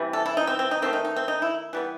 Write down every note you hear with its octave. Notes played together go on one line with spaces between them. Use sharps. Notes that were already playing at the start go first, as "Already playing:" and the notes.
Already playing: C3 E3 G3
A4
E4
D#4
C4
C4
D#4
D#3 A3 C4
D#4
D#4
C4
D#4
E4
E3 G3 B3